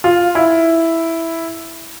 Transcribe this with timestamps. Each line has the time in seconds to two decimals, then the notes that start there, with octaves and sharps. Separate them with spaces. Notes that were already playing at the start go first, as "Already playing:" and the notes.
0.04 F4
0.35 E4